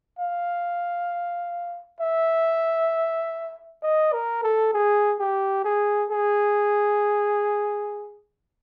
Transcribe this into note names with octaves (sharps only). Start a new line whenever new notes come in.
F5
E5
D#5
A#4
A4
G#4
G4
G#4
G#4